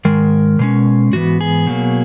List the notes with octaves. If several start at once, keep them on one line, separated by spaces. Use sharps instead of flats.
G#2 D#3 G#3 A#4
B2 G#3 C#4
G#2 E3 B3 F#4
G#4
B2 F#3 A#3